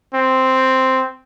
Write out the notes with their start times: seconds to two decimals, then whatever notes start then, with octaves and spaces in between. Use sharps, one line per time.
0.14 C4